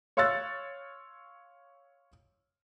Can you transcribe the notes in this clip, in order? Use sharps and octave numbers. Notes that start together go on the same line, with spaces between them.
C#5 F5 C6 E6 F#6 A6